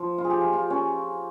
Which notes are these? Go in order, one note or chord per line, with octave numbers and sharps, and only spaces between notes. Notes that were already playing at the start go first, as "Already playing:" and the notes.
Already playing: F3
F4
G#4
G4
F4
F4
C#4